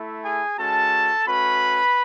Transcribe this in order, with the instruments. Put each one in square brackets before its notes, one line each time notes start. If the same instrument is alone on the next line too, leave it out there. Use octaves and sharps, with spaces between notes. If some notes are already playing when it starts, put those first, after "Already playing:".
Already playing: [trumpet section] A3 E4
G#4 G#5
G#3 C#4 F#4 A4 A5
A3 C#4 F#4 B4 B5